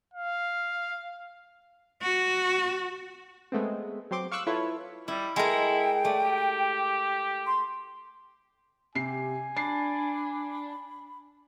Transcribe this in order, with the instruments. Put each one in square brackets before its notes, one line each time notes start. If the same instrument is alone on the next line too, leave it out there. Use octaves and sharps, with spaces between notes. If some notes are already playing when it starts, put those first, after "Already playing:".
[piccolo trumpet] F5
[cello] F#4
[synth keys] G#3 A3 B3 C4
F#3 C4 C6 D6
F5 C#6 D6 E6 F#6
E4 F4 A4 B4 C#5
[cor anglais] G3 [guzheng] E4
[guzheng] G#3 A4 A#4 [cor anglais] E4 [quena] G5
[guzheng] A3 [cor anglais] D5
[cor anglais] G4
[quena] C6
[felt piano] C3 C7 [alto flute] G4 [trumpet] G#5
[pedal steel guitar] D4 [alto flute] B5 [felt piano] C7